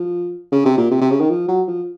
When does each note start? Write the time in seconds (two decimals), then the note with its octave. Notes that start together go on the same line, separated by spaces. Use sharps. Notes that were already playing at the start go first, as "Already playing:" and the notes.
Already playing: F3
0.52 C#3
0.66 C3
0.78 A#2
0.91 C3
1.01 C3
1.11 C#3
1.20 D#3
1.30 F3
1.48 F#3
1.68 F3